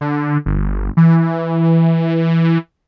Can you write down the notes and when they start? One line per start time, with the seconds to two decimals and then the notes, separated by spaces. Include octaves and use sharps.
0.01 D3
0.46 G1
0.97 E3